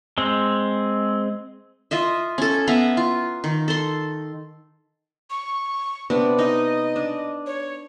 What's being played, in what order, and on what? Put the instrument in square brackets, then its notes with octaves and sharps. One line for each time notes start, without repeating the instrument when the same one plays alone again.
[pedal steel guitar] G#3 C4
[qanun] F4 D#5 E5
C#4 A4
B3 E5 F5 A#5
F4
D#3
A4 C6
[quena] C#6
[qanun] C3 B3 D4
[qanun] D#4 [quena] D#5
[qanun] D4
[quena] C#5